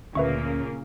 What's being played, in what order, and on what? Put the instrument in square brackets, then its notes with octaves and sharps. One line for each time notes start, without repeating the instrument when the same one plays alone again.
[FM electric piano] D2 [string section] A#2 C#3 A#3 [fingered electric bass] C#4 [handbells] B4 E5 C#6